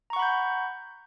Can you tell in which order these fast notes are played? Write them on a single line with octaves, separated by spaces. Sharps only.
A#5 C#6 F#5 B5 G6